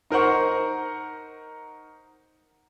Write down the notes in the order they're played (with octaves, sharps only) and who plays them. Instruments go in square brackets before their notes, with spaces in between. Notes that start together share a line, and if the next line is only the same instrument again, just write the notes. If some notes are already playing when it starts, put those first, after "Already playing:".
[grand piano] D#4 A#4 C5 F#5 C#6